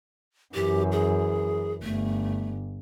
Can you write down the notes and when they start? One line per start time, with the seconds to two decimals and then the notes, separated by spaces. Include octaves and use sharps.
0.55 F#2 E3 G4
0.92 G#4
1.83 G1 A3